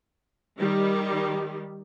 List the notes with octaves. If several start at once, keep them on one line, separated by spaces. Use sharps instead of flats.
D#3 G3